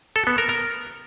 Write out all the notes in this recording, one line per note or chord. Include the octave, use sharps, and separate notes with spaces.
A4
B3
A#4
A#4